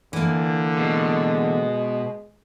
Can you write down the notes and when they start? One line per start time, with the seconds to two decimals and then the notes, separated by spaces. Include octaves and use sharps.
0.13 D3 E3 A#3
0.78 B2 G#3